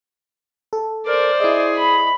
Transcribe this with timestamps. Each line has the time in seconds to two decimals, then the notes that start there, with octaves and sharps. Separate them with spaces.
0.73 A4
1.06 A#4 C5 D5
1.40 E4 G#4 D#5
1.76 B5